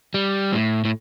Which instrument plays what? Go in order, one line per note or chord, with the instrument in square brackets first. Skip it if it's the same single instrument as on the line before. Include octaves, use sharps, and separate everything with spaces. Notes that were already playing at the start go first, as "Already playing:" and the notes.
[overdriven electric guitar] G3
A2
A2